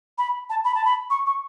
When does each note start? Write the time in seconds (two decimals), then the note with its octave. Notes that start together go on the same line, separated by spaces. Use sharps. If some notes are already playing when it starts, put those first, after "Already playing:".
0.18 B5
0.50 A5
0.65 B5
0.75 A5
0.85 B5
1.10 C#6
1.26 C#6